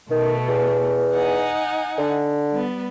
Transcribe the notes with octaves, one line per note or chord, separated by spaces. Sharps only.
B2 D#3 A3
E2
D#4 F#5 G#5
D3
G3 B3